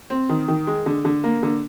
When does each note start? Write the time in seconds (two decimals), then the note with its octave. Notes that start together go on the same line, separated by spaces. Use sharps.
0.10 C4
0.29 D#3
0.48 D#3
0.67 G#3
0.86 D3
1.05 D3
1.24 A#3
1.43 D3